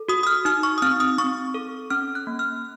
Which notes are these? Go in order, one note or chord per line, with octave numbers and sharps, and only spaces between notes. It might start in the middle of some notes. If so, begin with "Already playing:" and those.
Already playing: A4
F#4 D#6
D#6
F6
D#4 F6
C#6
D#6
C4 F6
D#6
C4 C#6
A4
C#4 F6
F#6
A#3
F6